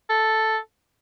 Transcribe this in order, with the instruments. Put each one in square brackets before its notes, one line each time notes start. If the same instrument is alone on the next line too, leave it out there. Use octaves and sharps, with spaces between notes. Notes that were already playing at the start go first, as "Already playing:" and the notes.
[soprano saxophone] A4